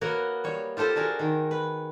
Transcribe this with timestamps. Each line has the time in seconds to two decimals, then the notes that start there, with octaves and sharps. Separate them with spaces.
0.01 A#3 B3 F#4 A#4 C#5
0.44 G3 C#5
0.77 F4 G4 A4 C5
0.95 D4 F#4 G#4 A#4
1.19 D#3
1.51 B4